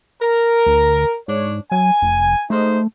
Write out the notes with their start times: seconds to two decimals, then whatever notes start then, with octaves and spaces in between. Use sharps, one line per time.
0.21 A#4
0.66 D2
1.28 G#2 D4 C#5
1.71 F#3 G#5
2.02 F1
2.50 G#2 A3 D#4 C5